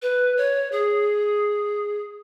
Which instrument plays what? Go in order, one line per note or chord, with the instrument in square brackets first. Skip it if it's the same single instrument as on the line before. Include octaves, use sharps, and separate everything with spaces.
[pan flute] B4
C#5
G#4